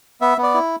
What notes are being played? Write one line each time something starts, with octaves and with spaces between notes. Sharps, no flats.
B3 E5
B3
D5
E4